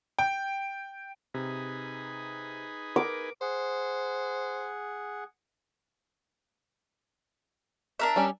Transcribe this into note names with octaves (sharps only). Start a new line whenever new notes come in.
G5
C3 D#4 G#4 B4
A#4 D6
G#4 C5 F#5
D4 A#4 E5
G3 C#4